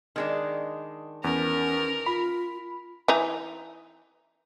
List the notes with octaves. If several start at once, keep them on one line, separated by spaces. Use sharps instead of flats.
D#3 G#3 D4
E2 C#4 A#4
F4 B5
E3 D#4